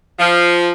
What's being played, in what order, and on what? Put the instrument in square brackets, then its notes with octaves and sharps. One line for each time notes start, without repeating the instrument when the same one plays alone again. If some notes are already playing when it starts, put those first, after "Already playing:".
[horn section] F3